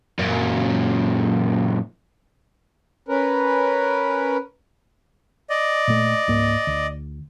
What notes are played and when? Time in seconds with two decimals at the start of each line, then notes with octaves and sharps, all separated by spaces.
0.19 F#2 A#2
3.08 C#4 A#4 B4
5.50 D5 D#5
5.88 A#2 A3
6.28 C#2 G#2 A#3
6.67 D2